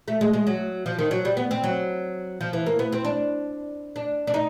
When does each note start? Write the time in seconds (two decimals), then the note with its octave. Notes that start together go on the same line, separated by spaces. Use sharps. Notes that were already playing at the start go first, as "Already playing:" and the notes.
0.08 A3
0.21 G#3
0.33 G#3
0.47 F#3
0.86 F3
0.99 D#3
1.11 F#3
1.25 G3
1.37 B3
1.51 C4
1.64 F#3
2.41 F3
2.53 E3
2.66 A#3
2.79 B3
2.92 C4
3.05 D4
3.96 D4
4.27 D4
4.34 D#4